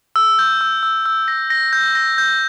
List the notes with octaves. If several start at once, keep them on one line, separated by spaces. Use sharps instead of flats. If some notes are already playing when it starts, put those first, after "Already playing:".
E6
G6
E6
E6
E6
A#6
A#6
G6
A#6
G6